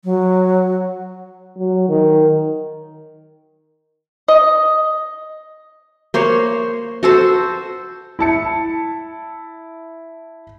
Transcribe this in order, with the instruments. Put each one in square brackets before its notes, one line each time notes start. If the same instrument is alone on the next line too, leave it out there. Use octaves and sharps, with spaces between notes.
[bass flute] F#3
[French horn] F#3
D#3
[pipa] D#5
[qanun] A#3 C5 C#5
F#4 A4 C5
[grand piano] E4 A5 C#7